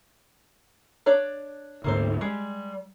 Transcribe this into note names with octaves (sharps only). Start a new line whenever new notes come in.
D4 C#5 D5
D2 G#2 A#3 A4 C5
G3 G#3